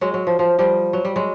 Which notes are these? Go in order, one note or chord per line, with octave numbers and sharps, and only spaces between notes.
F#3 G#3
F#3
F3
F3
F3 G3
F#3
G3
F#3 G#3